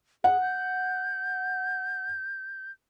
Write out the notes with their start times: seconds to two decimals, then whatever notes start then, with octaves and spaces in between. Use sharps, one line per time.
0.24 G#4 F#5
0.41 G6